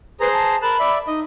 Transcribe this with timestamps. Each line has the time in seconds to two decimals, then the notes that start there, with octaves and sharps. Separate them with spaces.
0.20 G#4 B4 C5 A#5
0.33 A5
0.62 A#4 A5 B5 F#6
0.79 D5 E5
1.07 D#4 D#5